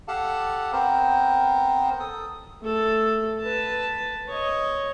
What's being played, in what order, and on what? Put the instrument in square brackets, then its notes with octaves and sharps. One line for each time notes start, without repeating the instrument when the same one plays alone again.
[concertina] G4 A4 F5 F#5 A5
B3 C4 A#4 C5
A4 D#6
[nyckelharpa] A3 A4
B4 A5
C#5 D#5